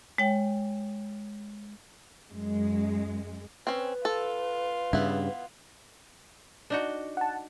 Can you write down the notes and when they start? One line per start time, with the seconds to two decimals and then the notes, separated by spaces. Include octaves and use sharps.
0.18 G#3 C#5 G5
2.30 F#2 G#3
3.67 C4 C#4 B4
4.05 F4 A4
4.93 G2 C#3 B3 E4
6.70 D4 D#4 F#4
7.17 F#5 A5